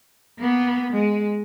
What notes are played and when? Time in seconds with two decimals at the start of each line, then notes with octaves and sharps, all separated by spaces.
0.38 A#3 B3
0.92 G#3